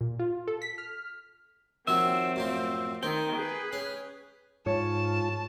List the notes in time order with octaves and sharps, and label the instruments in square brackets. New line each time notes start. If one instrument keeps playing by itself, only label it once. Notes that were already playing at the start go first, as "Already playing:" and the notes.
[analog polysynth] A#2
F4
A4
B6
F6
[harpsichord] D#3 F3 F#3 [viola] C4 [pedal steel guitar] E5
[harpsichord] F#2 A2 F3
[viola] D#3 [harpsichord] C4 [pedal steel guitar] G5
[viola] G#4 B4
[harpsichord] C#4
[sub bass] G#2 [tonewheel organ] G#3 F4 [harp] C#5 [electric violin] A5